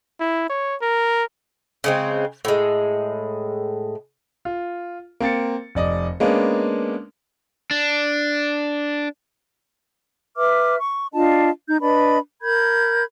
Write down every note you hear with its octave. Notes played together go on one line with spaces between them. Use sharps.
E4
C#5
A#4
C#3 G#3 C4
A2 G#3
F4
A#3 C4 A6 C#7
F1 D5 D#5
G#3 A#3 B3 C#4 D4
D4
B4 E5 D6 F6
C#6
D4 F4 D#5 A5
D#4 G6
D4 B4 D#5 B5
A#4 B5 G6 G#6